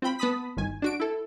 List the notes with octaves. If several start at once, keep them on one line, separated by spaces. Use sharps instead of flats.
C4 F4 G5 B5
B3 A5 B5 D#6 B6
G1 D#3 G#5
D4 F#4 D7
E4 A4